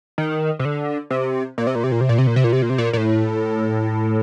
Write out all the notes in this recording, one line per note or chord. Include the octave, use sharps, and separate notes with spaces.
D#3
C3
D3
C3
A#2
C3
A#2
C3
A#2
C3
A#2
C3
A#2
C3
A#2
C3
A#2
C3
A#2
A#2
A2